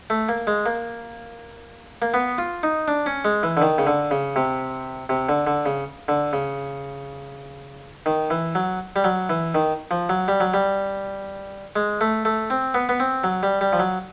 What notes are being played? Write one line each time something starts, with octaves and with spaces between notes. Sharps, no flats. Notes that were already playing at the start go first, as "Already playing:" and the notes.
A3
A#3
G#3
A#3
A#3
B3
F4
D#4
D4
C#4
G#3
E3
D3
D#3
C#3
D3
C#3
C3
C3
D3
D3
C#3
D3
C#3
D#3
E3
F#3
G3
F#3
E3
D#3
F3
F#3
G3
F#3
G3
G#3
A3
A3
C4
B3
B3
C4
F#3
G3
G3
F3
F#3